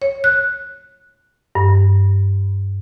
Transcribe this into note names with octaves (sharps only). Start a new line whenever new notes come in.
C#5
F#6
G2